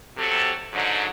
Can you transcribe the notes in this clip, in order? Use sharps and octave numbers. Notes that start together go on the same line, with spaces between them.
C3 F#3 A4
G#2 D3 F#3